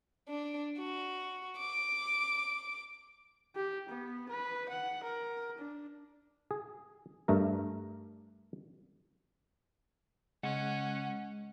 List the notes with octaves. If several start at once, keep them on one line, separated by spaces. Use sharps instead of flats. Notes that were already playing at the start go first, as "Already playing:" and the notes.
D4
F#4
D6
G4
B3
B4
F#5
A#4
D4
G#4
G2 A3 A#4
C#3 G#3 C#4 F#5